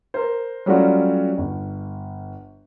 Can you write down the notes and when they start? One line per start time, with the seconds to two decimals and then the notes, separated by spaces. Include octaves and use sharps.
0.14 A#4 C5
0.66 F#3 G3 A3 C#4 F4 F#4
1.38 G1